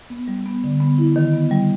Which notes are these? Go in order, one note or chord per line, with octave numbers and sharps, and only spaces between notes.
B3
G3
B3
D3
B3
E4
D#3
B3
G3